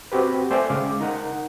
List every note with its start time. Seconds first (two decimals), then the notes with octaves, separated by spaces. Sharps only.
0.12 C4 F#4 G4 B4
0.50 A3 C5 D5 E5 G5 G#5
0.70 C#3 G#3 F5 D6
1.00 D#4 A#4 F#5